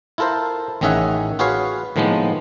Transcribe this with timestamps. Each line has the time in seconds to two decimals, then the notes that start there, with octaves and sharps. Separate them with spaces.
0.18 E4 F4 A4 A#4 C5
0.81 A1 D#3 C#4 G#4 E5 F#5
1.39 F4 F#4 G#4 B4 C#5 F5
1.96 A2 D#3 F3 G#3 A#3 B3